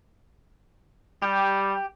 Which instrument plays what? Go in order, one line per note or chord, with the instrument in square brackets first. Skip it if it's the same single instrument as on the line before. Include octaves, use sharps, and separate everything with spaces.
[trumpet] G3 [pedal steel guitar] G4